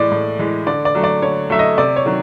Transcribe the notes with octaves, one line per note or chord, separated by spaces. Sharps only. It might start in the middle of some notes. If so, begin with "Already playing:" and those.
Already playing: A2 E3 G#3 D5
A2
E3 G#3
D3 D5
D5
F#3 A3
D5
D3 C#5
F#3 A3 E5
D#5
C3 D5
C#5
D#3 F#3